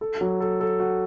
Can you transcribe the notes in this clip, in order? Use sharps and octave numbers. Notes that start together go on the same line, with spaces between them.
A4
F#3
A4
A4
F#4